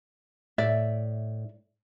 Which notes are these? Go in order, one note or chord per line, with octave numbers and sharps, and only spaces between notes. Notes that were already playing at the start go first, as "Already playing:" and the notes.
A2 D5 E5